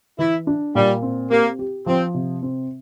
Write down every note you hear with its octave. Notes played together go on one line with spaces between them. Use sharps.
E3 E4
D4
A#2 G3
C4
A#3 G4
G4
F3 C4
C3
C4